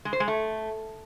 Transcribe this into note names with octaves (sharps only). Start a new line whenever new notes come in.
G#3
C5
G#3
A3